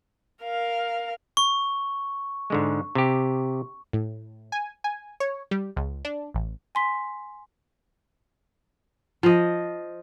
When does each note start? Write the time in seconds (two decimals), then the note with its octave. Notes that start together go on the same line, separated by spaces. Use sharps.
0.43 A#4 F5
1.37 C#6
2.50 G#2 D3 G#3
2.95 C3 G4
3.93 A2
4.52 G#5
4.84 G#5
5.20 C#5
5.51 G3
5.76 C#2
6.05 D4
6.34 A1
6.75 G#5 C6 B6
9.23 F3 D#5